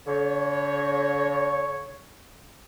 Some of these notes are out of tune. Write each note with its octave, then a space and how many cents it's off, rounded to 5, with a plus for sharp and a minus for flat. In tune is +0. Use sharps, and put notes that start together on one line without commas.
D3 -45 C#5 +0